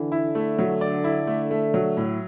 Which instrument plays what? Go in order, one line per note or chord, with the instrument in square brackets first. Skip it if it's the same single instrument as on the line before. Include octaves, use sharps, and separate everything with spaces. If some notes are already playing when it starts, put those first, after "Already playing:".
Already playing: [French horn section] D3 [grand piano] E3
[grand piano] E4
A3
F#3
D5
E4
A3
A3
F#3
A2